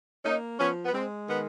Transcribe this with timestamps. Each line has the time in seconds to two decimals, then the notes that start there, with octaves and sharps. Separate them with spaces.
0.24 A#3 C#4 D#4
0.59 F3 B3 C#4
0.85 B3
0.93 G#3 C4
1.28 D#3 B3